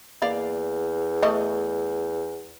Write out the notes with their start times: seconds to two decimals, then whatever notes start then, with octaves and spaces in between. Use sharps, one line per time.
0.22 E2 A#3 D5 F5
1.23 A3 D#5